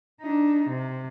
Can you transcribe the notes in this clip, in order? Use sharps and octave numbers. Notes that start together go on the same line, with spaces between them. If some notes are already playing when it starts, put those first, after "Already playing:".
D4 D#4
C3